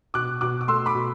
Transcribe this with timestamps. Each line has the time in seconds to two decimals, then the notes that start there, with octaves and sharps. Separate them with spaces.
0.14 B2 D6 F#6
0.41 B2 D6 F#6
0.61 D6
0.68 A3 C6 E6
0.86 B5 D6
0.95 B2